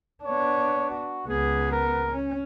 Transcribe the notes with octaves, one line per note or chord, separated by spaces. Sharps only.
B3 D4 C#5
F#4
C#2 B3 G#4
A#4
C#4